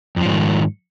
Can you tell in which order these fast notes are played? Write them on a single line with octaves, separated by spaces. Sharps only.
F2 F3 G#2 D#3